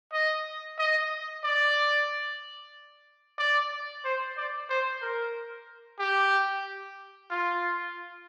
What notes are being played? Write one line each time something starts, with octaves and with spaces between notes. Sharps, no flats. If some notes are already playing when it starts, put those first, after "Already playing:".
D#5
D#5
D5
D5
C5
D5
C5
A#4
G4
F4